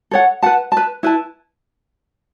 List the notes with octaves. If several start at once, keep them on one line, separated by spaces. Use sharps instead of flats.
A4 C#5 F#5
B4 F#5 A5
B4 A5
E4 B4 A5